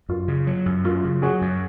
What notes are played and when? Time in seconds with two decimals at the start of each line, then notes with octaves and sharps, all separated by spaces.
0.09 F#2 F4
0.28 C#3
0.47 F#3
0.66 F#2
0.84 F#2 F4
1.04 C#3
1.22 F#3 F#4 G#4
1.42 F#2